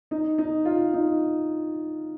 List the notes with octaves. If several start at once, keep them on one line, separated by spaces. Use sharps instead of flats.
D#4
D#4
F4
D#4